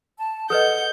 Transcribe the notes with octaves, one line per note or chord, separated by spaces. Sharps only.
A5
A4 B4 D#5 F#5 G6